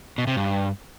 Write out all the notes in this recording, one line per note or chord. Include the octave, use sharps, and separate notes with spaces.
B2
C3
G2